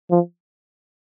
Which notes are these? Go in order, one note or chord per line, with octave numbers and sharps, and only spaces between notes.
F3